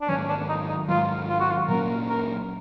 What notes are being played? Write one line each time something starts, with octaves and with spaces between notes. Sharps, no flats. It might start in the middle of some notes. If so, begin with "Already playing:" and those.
D4
G#2 D#3 F#3 C#4
D4
D#4
D#4
G#2 D#3 F#3 F4
F4
F#4
F4
A#2 F#3 A#3 C#4 A#4
A#4